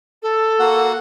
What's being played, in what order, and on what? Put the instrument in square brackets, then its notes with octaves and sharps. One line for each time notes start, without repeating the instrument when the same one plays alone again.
[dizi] A4
[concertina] A#3 F#4 F#5